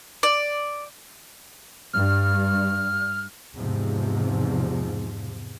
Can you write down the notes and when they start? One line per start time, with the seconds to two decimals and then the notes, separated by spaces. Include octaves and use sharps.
0.23 D5
1.93 G2 F6
3.56 E2 G#2 C3 F3